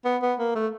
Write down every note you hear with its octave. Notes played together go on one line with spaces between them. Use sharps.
B3
B3
A#3
A3